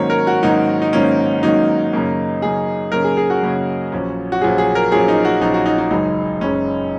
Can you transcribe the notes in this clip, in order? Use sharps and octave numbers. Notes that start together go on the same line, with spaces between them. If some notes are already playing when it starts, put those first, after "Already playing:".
Already playing: G#2 D#3 F#3 A#3 C#4 C#5
A#4
F#4
G#2 D#3 F#3 A#3 C#4 D#4
D#4
G#2 D#3 F#3 A#3 C#4
G#2 D#3 F#3 A#3 C#4 D#4
F#2 C#3 A#3 C#4
F#2 C#3 A#3 C#4 G#4
F#2 C#3 A#3 C#4 A#4
G#4
G#4
F#4
F#2 C#3 A#3 C#4
A#1 A#2 F#3 C#4
F#4
A#1 A#2 F#3 C#4 G#4
G#4
A#4
A#1 A#2 F#3 C#4 G#4
D#4
F#4
A#1 A#2 F#3 C#4 D#4
F#4
D#4
D#4
F#1 F#2 C#3 G#3 D#4
F#1 F#2 C#3 G#3 C#4